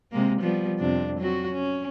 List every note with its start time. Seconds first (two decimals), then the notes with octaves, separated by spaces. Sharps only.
0.12 C3 G#3 A#3
0.41 F3 G3 B3
0.79 F2 C3 D4
1.19 F#3 C4 F#4
1.52 C#4